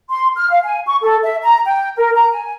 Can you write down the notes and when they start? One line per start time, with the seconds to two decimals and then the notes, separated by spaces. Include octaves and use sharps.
0.10 C6
0.36 F6
0.50 F5
0.64 G#5
0.86 C#6
1.01 A4
1.24 E5
1.43 A#5
1.65 G5
1.97 A#4
2.15 A#5
2.31 G#5